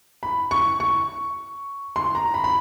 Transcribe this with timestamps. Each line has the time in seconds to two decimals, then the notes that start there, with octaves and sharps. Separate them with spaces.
0.23 B5
0.51 C#6
0.80 C#6
1.96 C6
2.15 A#5
2.34 B5
2.44 B5